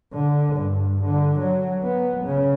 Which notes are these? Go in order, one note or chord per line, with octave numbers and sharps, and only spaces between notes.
D3
G2
D3
F#3
B3
C#3